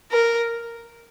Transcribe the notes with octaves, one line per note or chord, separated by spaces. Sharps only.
A#4